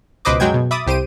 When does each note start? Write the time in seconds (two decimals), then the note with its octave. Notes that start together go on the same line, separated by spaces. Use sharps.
0.25 C#2 B2 B4 C5 D#5 D6
0.40 F#2 F#3 G#3 G5 G#6
0.54 B2
0.71 E5 B5 D6 D#6 A6
0.87 C2 G4 C5 D7 D#7